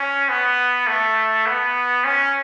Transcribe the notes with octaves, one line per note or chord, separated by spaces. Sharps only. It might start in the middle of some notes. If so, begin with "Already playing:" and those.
Already playing: C#4
B3
A3
B3
C#4